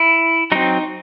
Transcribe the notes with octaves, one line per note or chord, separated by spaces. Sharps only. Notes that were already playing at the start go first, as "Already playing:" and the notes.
Already playing: E4
F#3 C4 D#4